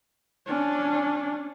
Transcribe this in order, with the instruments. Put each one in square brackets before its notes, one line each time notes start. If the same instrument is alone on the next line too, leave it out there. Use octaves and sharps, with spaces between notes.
[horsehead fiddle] C#4 D4